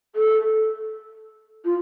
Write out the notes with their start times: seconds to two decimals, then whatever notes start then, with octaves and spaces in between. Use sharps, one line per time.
0.15 A4
1.65 F4